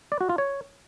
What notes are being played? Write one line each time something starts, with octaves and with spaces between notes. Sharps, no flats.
D5
F#4
F4
C#5